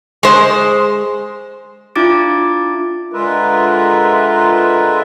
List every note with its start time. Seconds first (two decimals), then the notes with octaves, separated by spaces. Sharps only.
0.23 G#3 C5
1.95 D4 E4 F4 D6 A6 D7
3.13 D3 G#3 F4 A#4 B4 E5